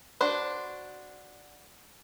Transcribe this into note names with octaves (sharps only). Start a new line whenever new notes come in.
D4 F#4 C5